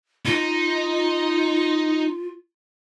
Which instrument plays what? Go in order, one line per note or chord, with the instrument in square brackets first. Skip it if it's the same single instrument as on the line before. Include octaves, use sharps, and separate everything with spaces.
[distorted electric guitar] D#4 [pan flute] F4